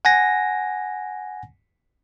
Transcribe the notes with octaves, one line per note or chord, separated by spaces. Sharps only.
F#5 G#5 A#6